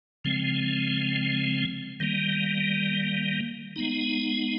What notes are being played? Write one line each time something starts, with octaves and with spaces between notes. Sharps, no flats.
C#3 F3 G#3 C4
D#3 G3 A#3
G#3 B3 D#4